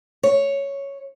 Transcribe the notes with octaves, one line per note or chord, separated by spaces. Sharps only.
C#5